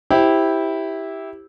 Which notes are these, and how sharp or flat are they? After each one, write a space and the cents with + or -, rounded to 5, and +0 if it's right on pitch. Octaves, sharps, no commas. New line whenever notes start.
E4 -10 G4 +0 C5 +0